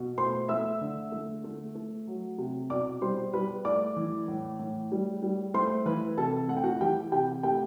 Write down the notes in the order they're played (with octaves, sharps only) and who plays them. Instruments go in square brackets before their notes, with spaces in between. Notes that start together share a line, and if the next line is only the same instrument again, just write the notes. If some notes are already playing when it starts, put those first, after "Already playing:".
Already playing: [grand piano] B2
A3 C5 C6
A3 E5 E6
D3
A3
A3
A3
F#3
C3
B2 D5 D6
G3 C5 C6
G3 B4 B5
A3 D5 D6
E3
A2
A2
G3
G3
A3 C5 C6
E3 B4 B5
C3 A4 A5
A3 F#5
G5
F#4 F#5
E3 G4 G5
C3 G4 G5
A3 G4 G5